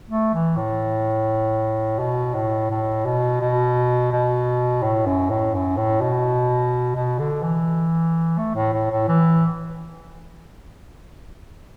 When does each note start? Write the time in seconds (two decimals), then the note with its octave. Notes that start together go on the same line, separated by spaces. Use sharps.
0.10 A3
0.34 E3
0.57 A2
1.99 B2
2.35 A2
2.70 A2
3.06 B2
3.41 B2
4.12 B2
4.83 A2
5.06 F#2
5.30 A2
5.54 F#2
5.77 A2
6.01 B2
6.95 B2
7.19 D3
7.42 E3
8.38 A3
8.55 A2
8.73 A2
8.91 A2
9.08 E3